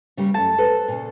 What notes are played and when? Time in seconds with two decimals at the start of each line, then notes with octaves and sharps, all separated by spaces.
0.17 C#3 G3 A#3
0.34 F#2 A3 A5
0.58 A4 B4 C5
0.88 A#2 C#3